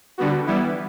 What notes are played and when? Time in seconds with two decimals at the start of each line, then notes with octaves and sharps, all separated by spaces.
0.18 D3 G3 B3 F#4
0.46 E3 G3 B3 E4